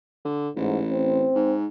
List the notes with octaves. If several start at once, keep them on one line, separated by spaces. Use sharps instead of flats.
D3
A1 G#2
C4
G#2